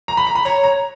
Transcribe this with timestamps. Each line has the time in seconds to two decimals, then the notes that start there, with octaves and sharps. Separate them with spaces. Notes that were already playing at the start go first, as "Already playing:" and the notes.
0.08 A#5
0.17 B5
0.27 A#5
0.35 B5
0.45 C#5 A#5
0.64 A#5